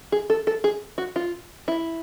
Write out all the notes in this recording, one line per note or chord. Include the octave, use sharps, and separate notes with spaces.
G#4
A4
A4
G#4
F#4
F4
E4